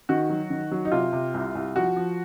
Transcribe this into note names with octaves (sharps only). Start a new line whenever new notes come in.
D#3 F#4
F#3
D#3
F#3
D#4
C3 F4
C3
C2
C2
F3 F#4
F3